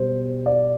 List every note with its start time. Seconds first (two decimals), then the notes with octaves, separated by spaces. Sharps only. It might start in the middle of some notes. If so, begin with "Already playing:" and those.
Already playing: B2 G3 C5
0.46 D5